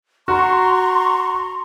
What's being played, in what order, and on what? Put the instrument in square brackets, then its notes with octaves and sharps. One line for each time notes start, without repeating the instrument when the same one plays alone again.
[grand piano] F#4 [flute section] A#5 C6 C#6